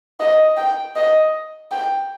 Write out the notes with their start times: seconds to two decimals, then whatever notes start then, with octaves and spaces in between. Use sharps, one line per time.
0.20 D#5
0.57 G5
0.96 D#5
1.71 G5